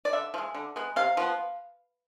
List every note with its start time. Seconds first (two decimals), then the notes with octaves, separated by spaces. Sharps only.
0.05 D5
0.13 D3 E5
0.34 F3
0.38 G#3
0.55 D3
0.76 G#3 B3
0.96 C3 F5
1.17 F3 B3